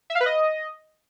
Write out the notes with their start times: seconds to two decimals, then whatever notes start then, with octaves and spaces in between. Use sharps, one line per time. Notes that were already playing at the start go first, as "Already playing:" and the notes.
0.10 E5
0.15 F5
0.20 B4
0.26 D#5